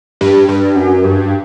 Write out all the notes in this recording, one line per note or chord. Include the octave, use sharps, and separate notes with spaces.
G2
G2
F#2
G2